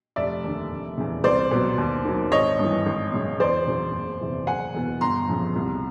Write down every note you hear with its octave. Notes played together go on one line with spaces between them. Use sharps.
F1 D5 E5
D#2 D3
F1
E2 C#3
C2 C5 D5
B2 F#3
D#2
D#3 F#3
G#1 C#5 D#5
G2
E3
G#1
F#2 C#3
E2 C5 D5
C#3 F#3
F#1
E2 C3 E3
F#1 F#5 G#5
E2 B2
G1 A#5 C6
F2 C#3
C2